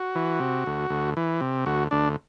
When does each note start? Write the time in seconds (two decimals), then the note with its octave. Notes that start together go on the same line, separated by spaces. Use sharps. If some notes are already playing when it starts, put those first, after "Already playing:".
Already playing: F#4
0.15 E3
0.40 C3
0.66 D2
0.90 D2
1.17 E3
1.41 C3
1.66 D2 F#4
1.91 D2 D4